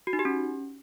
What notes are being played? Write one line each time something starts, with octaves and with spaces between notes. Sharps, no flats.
F#4
D#4
G4
C#4